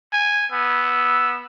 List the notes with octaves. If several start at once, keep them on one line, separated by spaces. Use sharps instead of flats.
G#5
B3 E6